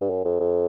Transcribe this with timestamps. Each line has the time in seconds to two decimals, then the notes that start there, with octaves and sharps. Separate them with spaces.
0.01 G2
0.10 F#2
0.25 F2
0.40 F2